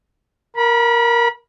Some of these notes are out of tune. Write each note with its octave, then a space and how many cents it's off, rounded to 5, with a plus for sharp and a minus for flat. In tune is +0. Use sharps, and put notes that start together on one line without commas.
A#4 +5 B5 -30